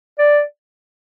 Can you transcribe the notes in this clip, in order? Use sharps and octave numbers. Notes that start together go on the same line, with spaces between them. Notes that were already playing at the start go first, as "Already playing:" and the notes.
D5